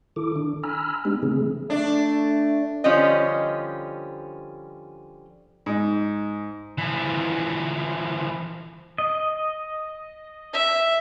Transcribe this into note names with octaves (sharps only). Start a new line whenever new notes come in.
D#3 E4 A4 D6
D#3 D4
G#5 A#5 B5 E6 F6
G#3 B3 D4 D#4 G4
C#3 E3 A3 C4 G#4
A3 D4
D3 F3 G3 C#4 D#5
G#2
E3 F3
D#5
E5